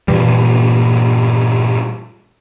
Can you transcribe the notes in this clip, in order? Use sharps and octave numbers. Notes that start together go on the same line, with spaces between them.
G2 A#2 E3 G3